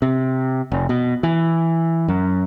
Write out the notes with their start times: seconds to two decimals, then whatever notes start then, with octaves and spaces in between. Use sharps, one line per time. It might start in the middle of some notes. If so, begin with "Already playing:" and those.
0.02 C3
0.72 F1
0.89 B2
1.23 E3
2.08 F#2